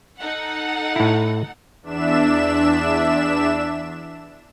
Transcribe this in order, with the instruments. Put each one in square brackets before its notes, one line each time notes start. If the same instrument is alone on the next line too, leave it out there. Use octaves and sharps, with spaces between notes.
[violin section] D#4 A4 F#5
[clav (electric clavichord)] A2 E4
[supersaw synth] E2 D4 E5 E7